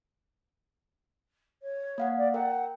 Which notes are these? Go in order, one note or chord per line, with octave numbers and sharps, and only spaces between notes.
C#5
A#3 F5 F#5
D5
A#4 F#5 G5